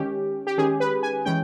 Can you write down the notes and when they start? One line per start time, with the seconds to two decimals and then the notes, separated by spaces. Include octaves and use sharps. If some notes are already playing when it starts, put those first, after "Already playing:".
Already playing: D#3 G#3 C#4 G4
0.47 G4
0.58 D#3 G#3 C#4 G#4
0.80 B4
1.03 G#5
1.25 E3 G#3 C#4 G5